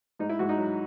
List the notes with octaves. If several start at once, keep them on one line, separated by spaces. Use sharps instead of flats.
G#2 D#4
E4
G#2 F#4
D#4
F#3